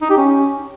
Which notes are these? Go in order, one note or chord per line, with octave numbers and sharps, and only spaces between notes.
D#4
G4
C#4